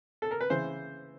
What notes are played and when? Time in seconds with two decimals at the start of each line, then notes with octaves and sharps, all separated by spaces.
0.22 A4
0.31 A#4
0.41 B4
0.50 C#3 E3 C5